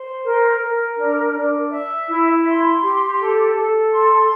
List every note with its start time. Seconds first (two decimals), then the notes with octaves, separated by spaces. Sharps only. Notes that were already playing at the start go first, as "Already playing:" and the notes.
Already playing: C5
0.23 A#4
0.59 A#4
0.96 D4
1.33 D4
1.70 E5
2.07 E4
2.45 C6
2.81 G4
3.18 A4
3.55 A4
3.91 C6